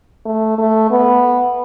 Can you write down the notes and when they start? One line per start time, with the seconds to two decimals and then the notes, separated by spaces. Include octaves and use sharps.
0.26 A3
0.58 A3
0.91 B3